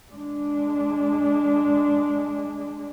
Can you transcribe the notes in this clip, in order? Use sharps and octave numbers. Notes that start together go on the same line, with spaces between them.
G#3 D4